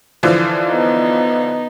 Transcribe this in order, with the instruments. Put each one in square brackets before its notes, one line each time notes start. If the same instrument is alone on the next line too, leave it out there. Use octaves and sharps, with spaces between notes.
[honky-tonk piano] D3 E3 F3
[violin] B3 D#4